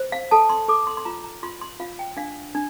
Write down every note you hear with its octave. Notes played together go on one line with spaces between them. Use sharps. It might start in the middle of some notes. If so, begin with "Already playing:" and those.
Already playing: C5
F5
A4 A5
C6
A4 D6
C6
C6
F4 A#5
A#5
F4 C6
C6
F4 F5
G5
D4 F5
D4